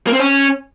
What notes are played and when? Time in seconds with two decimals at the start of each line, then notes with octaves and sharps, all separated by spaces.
0.07 A#3
0.13 C4
0.20 C#4